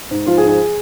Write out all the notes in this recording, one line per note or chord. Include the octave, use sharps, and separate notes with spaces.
G#2
F3 F4
G#4
G#2
G#4